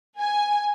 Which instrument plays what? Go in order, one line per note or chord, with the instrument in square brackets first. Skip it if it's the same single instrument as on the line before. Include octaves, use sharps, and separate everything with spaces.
[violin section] G#5